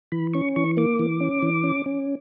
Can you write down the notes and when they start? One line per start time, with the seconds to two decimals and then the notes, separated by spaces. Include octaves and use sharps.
0.12 E3 B5
0.33 C#4 C#6
0.56 E3 C#6
0.77 A#3 D6
0.99 E3
1.20 C#4
1.42 E3
1.63 C#4
1.86 C#4